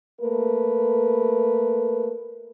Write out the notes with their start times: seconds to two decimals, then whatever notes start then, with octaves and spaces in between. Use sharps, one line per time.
0.20 A3 A#3 A#4 B4